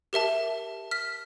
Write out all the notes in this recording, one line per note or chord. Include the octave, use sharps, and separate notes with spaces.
G4 A#4 E5 A5
F6 B6